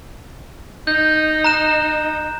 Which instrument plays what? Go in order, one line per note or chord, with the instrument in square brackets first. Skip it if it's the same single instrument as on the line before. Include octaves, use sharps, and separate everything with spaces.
[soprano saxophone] D#4 [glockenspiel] G6
[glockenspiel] A#5 F#6 E7